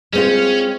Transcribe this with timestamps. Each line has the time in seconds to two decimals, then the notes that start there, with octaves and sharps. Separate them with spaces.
0.13 G#3 C4 C#4 F4